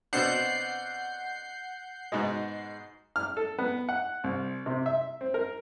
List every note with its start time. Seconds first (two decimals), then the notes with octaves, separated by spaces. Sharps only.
0.13 B2 C4 D4 F#5 G6 C7
2.12 G#2 B2 G#3
3.16 F6
3.37 A4
3.58 B3
3.89 F#5
4.24 C2
4.66 C3
4.86 E5
5.21 C4
5.34 A#4